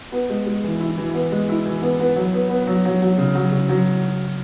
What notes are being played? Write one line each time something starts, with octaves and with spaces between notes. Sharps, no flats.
B3
G#3
G#3
E3
E4
E3
B3
G#3
E4
E3
B3
B3
F#3
B3
B3
F#3
F#3
F#3
C#3
F#3
C#3
F#3